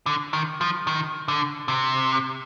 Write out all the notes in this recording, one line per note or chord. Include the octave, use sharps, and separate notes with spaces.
D3
D#3
F3
D#3
D3
C3